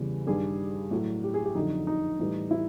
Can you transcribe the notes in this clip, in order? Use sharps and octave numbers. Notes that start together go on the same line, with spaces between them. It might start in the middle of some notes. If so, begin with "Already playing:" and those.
Already playing: E2 C#3 E3 G3
G2 D#3 G3 G#4
A2 F#3
G4
G#4
G4
F2 D3 F#3 D#4
D#4
A2 E3 G3
E4